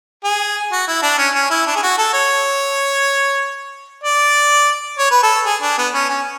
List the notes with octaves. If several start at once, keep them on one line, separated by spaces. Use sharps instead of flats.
G#4
F#4
E4
D4
C#4
C#4
E4
D4
G#4
F#4
A4
C#5
D5
C#5
B4
A4
G#4
D4
B3
C#4
C#4